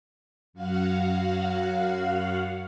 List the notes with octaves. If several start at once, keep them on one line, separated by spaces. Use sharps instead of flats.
F#2 F#4 F5 F#5